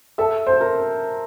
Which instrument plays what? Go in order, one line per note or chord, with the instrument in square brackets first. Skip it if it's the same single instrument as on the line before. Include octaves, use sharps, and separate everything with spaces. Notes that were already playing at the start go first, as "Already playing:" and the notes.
[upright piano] A4 [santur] E5
[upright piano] C5
[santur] A#4